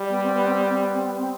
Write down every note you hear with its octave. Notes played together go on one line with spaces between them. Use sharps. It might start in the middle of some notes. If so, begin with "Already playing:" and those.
Already playing: G3
B3
C4
B3
C4
B3
C4
B3
C4
B3
C4